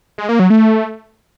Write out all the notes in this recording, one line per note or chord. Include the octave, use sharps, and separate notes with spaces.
G#3
A#3
F#3
A3